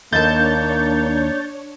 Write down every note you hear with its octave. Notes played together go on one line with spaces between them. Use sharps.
D#2 A#3 D4 C#5 A5 G6 A6